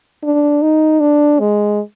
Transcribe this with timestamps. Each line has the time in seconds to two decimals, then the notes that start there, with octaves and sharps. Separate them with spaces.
0.23 D4
0.62 D#4
1.00 D4
1.40 G#3